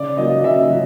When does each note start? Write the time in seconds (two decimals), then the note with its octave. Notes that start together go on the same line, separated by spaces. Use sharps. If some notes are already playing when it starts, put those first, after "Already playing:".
Already playing: C#3 D5
0.17 F#3 A#3 D#5
0.44 C#3 E5
0.70 F#3